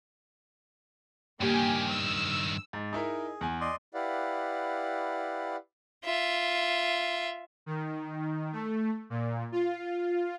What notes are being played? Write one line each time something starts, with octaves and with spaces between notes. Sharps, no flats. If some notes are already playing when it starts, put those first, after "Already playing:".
G2 D#3 A#3 G4 G#5
E6
G#2
D#4 E4 G#4 A#4
E2 G#5
D5 D#5 C6
E4 G4 B4 D5 F5 F#5
F4 E5
D#3
A3
A#2
F4